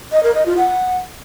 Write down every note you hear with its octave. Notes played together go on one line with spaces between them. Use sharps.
D#5
A#4
D#5
F4
F#5